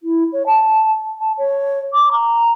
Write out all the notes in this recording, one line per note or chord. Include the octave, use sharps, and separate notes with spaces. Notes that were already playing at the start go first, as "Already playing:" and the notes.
E4
C#5
A5
A5
C#5
D6
A#5